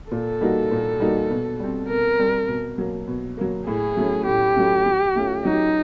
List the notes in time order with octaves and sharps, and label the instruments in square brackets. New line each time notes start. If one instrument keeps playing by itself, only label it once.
[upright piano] A#2 [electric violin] A4
[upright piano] G3 A#3 D#4 F#4
A#2
G3 A#3 D#4 F#4
B2
G3 C4
[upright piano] B2 [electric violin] A#4
[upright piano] G3 C4
B2
F#3 A#3
B2
F#3 A#3
[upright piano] A2 [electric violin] G#4
[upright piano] F#3 A3 C#4
[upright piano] A2 [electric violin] G4
[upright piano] F#3 A3 C#4
F#3
A3 C#4 F4
[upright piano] F#3 [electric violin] D#4